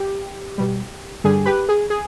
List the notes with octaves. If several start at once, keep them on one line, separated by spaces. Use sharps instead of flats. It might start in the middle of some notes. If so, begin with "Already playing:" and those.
Already playing: G4
B2 G3
G2 D3 G3 G#4
G4 B4
G#4
G#4